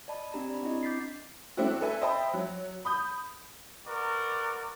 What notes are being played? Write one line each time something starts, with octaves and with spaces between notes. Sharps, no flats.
D5 D#5 A5 B5
C4 D4 G4 A#5
D5 B5
C4 D4 E4 D#5
D6 G6 A6 B6 C7
A3 C4 D4 E4 F#4
A4 B4 E5 G#5
C5 D#5 E5 G5 A5 B5
F#3
B5 D#6 G6
F#4 A#4 B4 D5